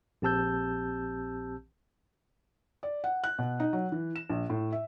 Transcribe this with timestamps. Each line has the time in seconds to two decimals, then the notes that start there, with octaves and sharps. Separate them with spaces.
0.22 A#1 C4 G4 A5 E6 G6
2.83 D5
3.04 F#5
3.24 F#6
3.39 B2
3.60 D#4
3.73 F#3
3.92 E3
4.16 E7
4.30 A#1
4.50 A2
4.72 E5